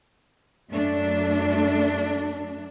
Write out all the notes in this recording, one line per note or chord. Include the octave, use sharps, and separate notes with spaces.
F#2 F#3 A3 D4